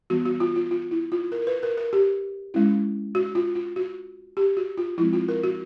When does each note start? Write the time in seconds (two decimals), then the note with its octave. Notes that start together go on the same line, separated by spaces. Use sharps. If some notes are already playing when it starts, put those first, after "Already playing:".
0.10 E3 G3 B3 F#4
0.26 F#4
0.40 F4
0.56 F4
0.71 F4
0.91 E4
1.12 F4
1.32 A#4
1.42 A#4
1.47 B4
1.63 A#4
1.78 A#4
1.93 G4
2.54 G#3 C#4 E4
3.15 F#4
3.35 F4
3.55 F4
3.76 F#4
4.37 G4
4.57 F#4
4.77 F4
4.98 F3 G#3 C4 E4
5.13 F4
5.28 A#4
5.44 F#4